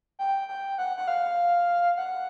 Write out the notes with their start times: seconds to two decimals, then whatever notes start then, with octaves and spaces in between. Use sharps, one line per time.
0.19 G5
0.48 G5
0.78 F#5
0.97 F#5
1.08 F5
1.97 F#5